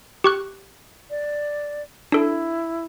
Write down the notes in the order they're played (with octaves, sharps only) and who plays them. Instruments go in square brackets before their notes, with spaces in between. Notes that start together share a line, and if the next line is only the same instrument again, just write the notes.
[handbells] G4 C#6 F#6
[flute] D5
[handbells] D4 A4 [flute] E4